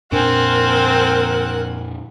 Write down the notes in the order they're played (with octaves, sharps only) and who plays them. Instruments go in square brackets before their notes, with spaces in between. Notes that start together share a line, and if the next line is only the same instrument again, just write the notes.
[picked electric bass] F2 A#2 D4 [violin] C4 [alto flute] A#4 [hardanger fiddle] F#5 G#5